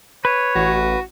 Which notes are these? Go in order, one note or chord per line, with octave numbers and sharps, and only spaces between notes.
B4 C#5
A1 F#4